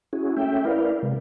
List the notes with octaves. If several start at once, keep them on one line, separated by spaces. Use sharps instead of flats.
C#4 E4 F#4 G#4
A3 C#4 E5 G5
E4 A#4 B4 D5 F5
C3 G#3